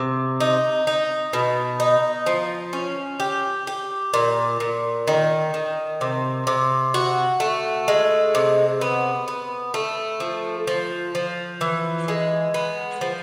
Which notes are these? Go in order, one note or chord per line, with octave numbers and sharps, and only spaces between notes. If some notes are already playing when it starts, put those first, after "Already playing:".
Already playing: C3
D#4
D#4
B2
D#4
F3
C#4
G4
G4
A#2
A#2
D#3
D#3
C3
C3
F#4
A3
G#3
C3
B3
B3
A3
F3
F3
F3
E3
G#3
B3
F3